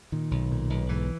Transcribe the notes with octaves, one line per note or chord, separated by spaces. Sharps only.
A#2 D#3
B1
A#2
B1
G#2 E3